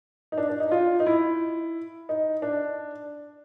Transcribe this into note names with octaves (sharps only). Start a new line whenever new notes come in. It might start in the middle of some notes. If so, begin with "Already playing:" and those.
D#4
D4
D4
D#4
F4
D#4
E4
D#4
D4